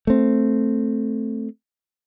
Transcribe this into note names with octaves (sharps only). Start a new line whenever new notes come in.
A3 C4